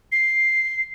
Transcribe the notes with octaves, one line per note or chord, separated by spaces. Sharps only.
C7